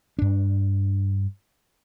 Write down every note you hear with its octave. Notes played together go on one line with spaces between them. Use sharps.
G2 D4